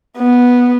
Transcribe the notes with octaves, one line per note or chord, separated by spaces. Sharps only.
B3